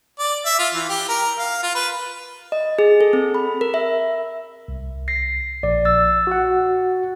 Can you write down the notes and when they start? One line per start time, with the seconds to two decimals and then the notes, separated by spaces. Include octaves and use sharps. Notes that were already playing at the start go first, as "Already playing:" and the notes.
0.19 D5
0.45 E5
0.59 F4
0.74 E3
0.89 G4
1.09 A#4
1.38 F5
1.63 F4
1.75 B4
2.52 D#5
2.79 G#4
3.01 A4
3.13 C4
3.34 B5
3.61 A#4
3.74 E5
4.68 C2
5.08 A#6 C7
5.63 A#1 D5
5.85 E6 A6
6.27 F#4 F#5